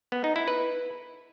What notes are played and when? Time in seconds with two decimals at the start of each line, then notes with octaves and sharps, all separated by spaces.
0.12 B3
0.24 D#4
0.36 E4
0.48 B4